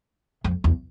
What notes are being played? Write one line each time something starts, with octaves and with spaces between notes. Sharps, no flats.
F2
E2